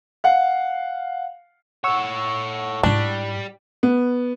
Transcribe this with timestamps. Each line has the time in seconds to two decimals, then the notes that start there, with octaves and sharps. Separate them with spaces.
0.24 F5 F#5
1.84 A4 C#5 F#5 C#6 E6
2.83 G#2 G3 D4 E4
3.83 B3